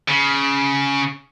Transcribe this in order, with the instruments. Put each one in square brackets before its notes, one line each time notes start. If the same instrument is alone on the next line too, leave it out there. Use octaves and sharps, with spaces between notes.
[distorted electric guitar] C#3